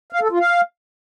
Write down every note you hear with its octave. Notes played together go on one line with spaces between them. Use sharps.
F5
A4
F4
F5